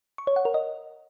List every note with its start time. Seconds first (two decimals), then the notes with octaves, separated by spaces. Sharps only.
0.18 C#6
0.27 C#5
0.36 F#5
0.45 A#4
0.54 D#5